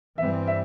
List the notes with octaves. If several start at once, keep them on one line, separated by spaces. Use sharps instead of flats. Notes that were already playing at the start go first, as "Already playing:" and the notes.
G2 E3 G3 C4 E5
E5